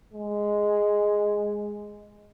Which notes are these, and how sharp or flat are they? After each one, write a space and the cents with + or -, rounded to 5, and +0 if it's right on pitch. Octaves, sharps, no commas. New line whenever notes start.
G#3 +0